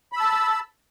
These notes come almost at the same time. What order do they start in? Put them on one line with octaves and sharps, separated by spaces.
B5 E6 A5